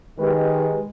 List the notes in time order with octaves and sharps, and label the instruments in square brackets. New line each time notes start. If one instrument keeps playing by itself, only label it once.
[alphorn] D#3 [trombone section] G#3 [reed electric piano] G4 B4